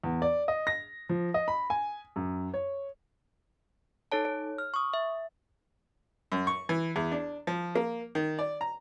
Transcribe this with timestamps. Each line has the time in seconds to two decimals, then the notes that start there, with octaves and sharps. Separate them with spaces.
0.04 E2
0.22 D5
0.48 D#5
0.67 A#6
1.09 F3
1.34 D#5
1.48 B5
1.70 G#5
2.16 F#2
2.54 C#5
4.12 D#4 A4 C#5 A5
4.25 C#5
4.58 F6
4.74 C#6 D#6
4.94 E5
6.32 F#2
6.47 C#6
6.69 E3
6.96 E2
7.12 D4
7.47 F3
7.75 A#3
8.15 D#3
8.39 D5
8.61 A#5